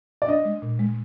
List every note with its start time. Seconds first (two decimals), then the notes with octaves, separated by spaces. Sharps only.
0.22 D5
0.28 D4 D#5
0.45 G#3
0.62 A#2
0.79 G#3